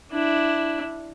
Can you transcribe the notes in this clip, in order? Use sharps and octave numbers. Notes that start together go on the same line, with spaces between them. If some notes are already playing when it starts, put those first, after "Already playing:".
D4 E4